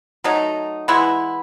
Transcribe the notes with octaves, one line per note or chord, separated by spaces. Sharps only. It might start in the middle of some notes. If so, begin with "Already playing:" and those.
F#3 A3 D#4
E3 G#3 B3 E4